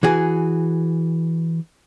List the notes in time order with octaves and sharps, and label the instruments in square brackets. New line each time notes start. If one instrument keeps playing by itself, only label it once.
[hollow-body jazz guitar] E3 F#4 G#4